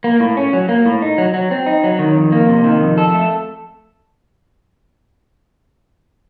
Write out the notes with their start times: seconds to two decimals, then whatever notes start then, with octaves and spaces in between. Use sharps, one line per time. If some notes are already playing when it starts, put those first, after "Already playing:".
0.04 A#3
0.20 A2
0.37 C#4
0.53 F#3
0.69 A#3
0.86 A2
1.02 D#4
1.18 F#3
1.34 F#3
1.51 C4
1.66 D#4
1.84 F#3
1.99 D#3
2.15 F2
2.32 A#3
2.49 C3
2.64 D#3
2.81 F2
2.98 A4
3.14 A3